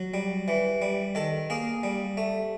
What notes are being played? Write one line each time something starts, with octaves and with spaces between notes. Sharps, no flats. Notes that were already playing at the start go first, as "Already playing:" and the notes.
Already playing: F#3
G3
E3
G3
D#3 A4
A#3 G#4
G3
A3